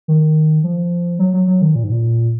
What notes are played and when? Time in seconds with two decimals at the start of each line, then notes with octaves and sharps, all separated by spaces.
0.08 D#3
0.64 F3
1.19 F#3
1.34 F#3
1.47 F#3
1.62 D#3
1.75 A#2
1.84 G#2
1.92 A#2